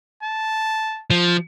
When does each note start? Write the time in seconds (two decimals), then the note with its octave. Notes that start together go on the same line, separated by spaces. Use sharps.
0.23 A5
1.10 F3